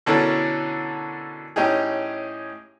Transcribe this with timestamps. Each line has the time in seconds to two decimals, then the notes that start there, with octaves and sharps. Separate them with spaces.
0.06 B2 D3 E3 C#4 A4 A#4
1.56 A2 C#4 D#4 G4 G#4